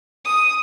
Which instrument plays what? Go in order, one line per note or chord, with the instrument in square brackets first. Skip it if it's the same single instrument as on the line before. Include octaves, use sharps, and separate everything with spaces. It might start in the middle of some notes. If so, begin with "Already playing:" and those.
[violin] D#6